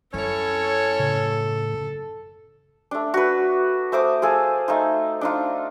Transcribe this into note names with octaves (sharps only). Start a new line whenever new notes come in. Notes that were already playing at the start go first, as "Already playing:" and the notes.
F#2 C#4 E4 A4 C#5
A2 C#3
A3 D4
F#4 B4
A3 C5 D6 D#6
F4 G#4 A4
A3 D#4 F4
D4 D#4 F4